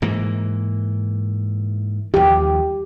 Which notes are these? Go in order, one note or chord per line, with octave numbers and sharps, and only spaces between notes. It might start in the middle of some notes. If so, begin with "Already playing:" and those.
G#2 E3 A#3
D#2 F3 G4